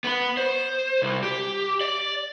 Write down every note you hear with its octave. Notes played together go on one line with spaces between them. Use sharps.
B3 B5
C5
C2
G4
D5